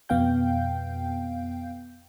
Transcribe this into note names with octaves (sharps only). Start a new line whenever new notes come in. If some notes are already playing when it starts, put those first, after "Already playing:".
F2 B2 B3 F5 G5 G6